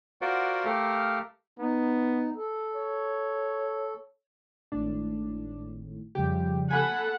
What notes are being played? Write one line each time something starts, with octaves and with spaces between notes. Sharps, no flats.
F4 F#4 A#4 C5 D5 F#5
A3 G4 A4 A#4 F5
B3 D#4
A4
C#5
G#1 A2 D4
F2 C#3 F3 G3 G4
A4 F#5 G#5 A5 B5